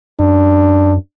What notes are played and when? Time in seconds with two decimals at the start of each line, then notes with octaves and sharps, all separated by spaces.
0.19 F#2 D4